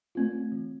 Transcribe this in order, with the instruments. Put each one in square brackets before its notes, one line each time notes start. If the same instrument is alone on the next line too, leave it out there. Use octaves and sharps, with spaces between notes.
[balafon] A3 C4 F4
E3